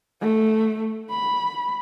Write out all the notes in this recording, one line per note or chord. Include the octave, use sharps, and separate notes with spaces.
A3
B5